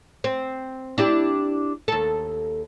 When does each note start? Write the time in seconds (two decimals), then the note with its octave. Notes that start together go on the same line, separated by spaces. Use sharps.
0.24 C4
0.98 D4 E4 G4
1.88 D#2 A4